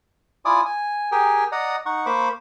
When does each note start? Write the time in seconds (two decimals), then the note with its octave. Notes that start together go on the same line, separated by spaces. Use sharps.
0.45 E4 F4 D5 G#5 D6 D#6
0.65 G#5
1.12 G4 G#4 A#4 G5 G#5
1.52 D5 D#5 F#5 A#5 D#6
1.86 D#4 F#5 C#6
2.06 A#3 C5 B5 C#6 D6